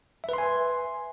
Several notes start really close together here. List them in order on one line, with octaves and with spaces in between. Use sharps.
E5 B4 C6 G#5